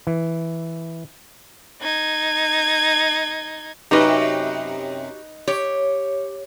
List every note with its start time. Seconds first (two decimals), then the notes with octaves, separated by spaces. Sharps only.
0.07 E3
1.81 D#4 G#6
3.91 F#2 C3 D#4 F#4 G4 B4
5.48 G4 C#5